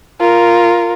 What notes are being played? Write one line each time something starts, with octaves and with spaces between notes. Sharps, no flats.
F4 A#4